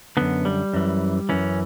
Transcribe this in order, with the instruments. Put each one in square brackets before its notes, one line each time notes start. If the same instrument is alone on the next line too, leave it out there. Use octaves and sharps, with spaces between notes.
[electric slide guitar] F#2 D3 B3
G3
F#2 E3
F#2 E3 C#4